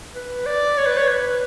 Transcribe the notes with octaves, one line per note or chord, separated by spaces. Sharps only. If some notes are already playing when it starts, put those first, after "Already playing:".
B4
D5
C#5
B4
C#5
B4